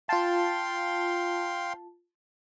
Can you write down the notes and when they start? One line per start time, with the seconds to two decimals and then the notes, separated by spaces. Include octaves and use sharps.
0.09 F4 F5 G5 A5 C6